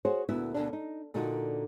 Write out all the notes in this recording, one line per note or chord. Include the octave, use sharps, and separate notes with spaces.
F#4 G#4 C5 C#5 F#5
D2 A#2 B3 E4 F#4 E5
D2 B2 A#3 D4
D#4
A#2 D3 A#3 D#4 F4 F#4